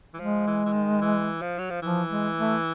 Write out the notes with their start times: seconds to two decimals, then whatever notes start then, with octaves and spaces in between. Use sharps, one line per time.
0.14 E3
0.18 F3 G#3
0.47 E3
0.66 E3
0.73 D#3
1.01 E3
1.42 F3
1.58 F#3
1.70 F3
1.82 E3 F3
2.10 G#3
2.37 A3